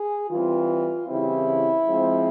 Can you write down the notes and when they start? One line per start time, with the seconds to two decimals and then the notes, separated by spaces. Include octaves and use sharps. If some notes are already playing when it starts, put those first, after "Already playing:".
Already playing: G#4
0.30 E3 G3 C4 F4
1.08 C#3 E3 G3 C4 E4
1.86 F3 G#3 C4